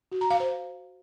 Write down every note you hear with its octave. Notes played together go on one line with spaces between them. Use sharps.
F#4
A#5
F5
C5